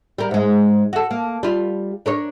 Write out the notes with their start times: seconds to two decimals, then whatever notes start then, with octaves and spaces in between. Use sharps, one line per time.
0.18 G3 A#4
0.31 G#2 G#3
0.93 F#4 A4
1.11 A#3
1.43 G3 F4
2.06 D4 A#4 C#5